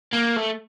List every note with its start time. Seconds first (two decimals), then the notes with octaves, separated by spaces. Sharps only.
0.13 A#3
0.36 A3